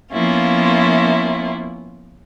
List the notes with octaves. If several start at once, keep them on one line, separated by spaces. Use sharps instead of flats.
F3 A#3 B3 C#4 E4 F4